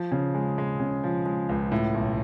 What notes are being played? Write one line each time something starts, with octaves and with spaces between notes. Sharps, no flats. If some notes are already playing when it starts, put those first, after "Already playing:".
Already playing: F3
C#3
G#3
G#3
C#3
F3
G#3
C#2
A2
B1